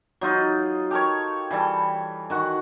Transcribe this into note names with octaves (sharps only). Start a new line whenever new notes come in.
F#3 D#4 F4 D#5
G4 A4 A#4 C#5
E3 G3 A4
D#3 F#4 F#5